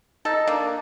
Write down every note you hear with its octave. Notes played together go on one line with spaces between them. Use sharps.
D#4 A4
A#3 D4